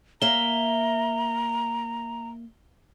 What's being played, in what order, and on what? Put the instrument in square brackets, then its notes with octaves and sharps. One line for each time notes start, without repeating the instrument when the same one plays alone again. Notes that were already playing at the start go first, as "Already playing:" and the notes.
[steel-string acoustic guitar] A#3 E5 [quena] A#5 [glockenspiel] G7